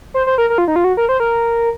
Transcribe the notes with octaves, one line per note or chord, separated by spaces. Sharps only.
C5
C5
A#4
A#4
F4
D#4
F4
F#4
A#4
C5
A#4